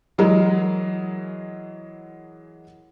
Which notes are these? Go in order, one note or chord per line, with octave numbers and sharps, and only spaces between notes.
E3 F#3 G#3 A#4 D#5